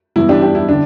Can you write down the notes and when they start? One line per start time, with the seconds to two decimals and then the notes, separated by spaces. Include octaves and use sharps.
0.16 G2 E3 B3 E4
0.29 D4 G4
0.42 D4 G4
0.55 E4
0.69 D3 D4